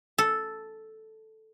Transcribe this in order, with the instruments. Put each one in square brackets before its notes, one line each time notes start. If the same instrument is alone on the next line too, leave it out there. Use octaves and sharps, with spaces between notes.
[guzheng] A4